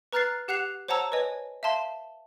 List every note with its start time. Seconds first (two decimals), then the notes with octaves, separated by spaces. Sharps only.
0.13 B4 A#5 F6 F#6 A6 C7
0.48 G4 F#5 F#6 C7 F7
0.88 C5 C#5 F#5 A5 A#5 E6
1.12 B4 C#5 D#5 G#5
1.63 E5 F5 A5 C6